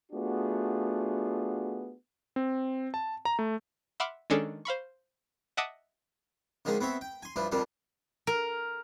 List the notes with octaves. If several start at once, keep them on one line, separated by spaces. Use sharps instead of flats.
A3 B3 D4 F4 F#4 G#4
C4
A5
A#5
A3
E5 F#5 B5 C6 D6 F6
D#3 G#3 C#4 D4 G#4 A4
C5 F5 B5 C#6
D#5 E5 F#5 A5 D6 D#6
D3 D#3 F3 G#3 D#4
B3 C4 C#5 E5
G5
G#5 C6
G2 F3 D4 E4
F2 D#3 F3 G3 D4
A#4